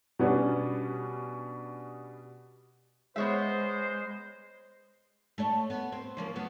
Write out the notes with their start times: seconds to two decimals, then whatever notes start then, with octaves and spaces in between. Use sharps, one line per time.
0.19 B2 G3 B3 C#4 D4
3.16 G#3 B3 C5 C#5 E5
5.38 A3 A4 C#5
5.70 B3
5.92 C4
6.17 C#3 F3 A#3
6.36 F#3 A3 B3